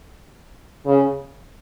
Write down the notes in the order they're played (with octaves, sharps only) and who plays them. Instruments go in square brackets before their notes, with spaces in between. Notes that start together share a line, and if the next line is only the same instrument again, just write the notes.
[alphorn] C#3